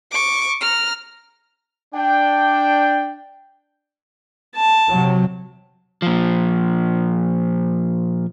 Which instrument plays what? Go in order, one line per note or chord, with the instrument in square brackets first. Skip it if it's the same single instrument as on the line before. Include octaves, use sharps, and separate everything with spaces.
[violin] C#6 D6
A#5 F6
[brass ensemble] D4 G5
[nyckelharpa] A5
[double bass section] C3 F#3
[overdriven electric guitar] A#2 F3